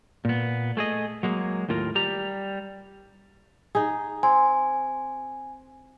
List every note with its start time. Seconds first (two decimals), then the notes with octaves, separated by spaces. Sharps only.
0.25 A#2 B3
0.77 A3 G#4 D#5
1.23 F#3 G#3 A#3
1.69 D#2 A2 F4 A#4
1.95 G3 G4 A#5
3.75 D#4 G#4
4.23 C4 G#5